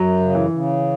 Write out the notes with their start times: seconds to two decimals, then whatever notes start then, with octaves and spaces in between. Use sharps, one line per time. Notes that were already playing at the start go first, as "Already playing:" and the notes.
Already playing: F#2 F#3
0.20 C#3
0.35 E3
0.50 C#3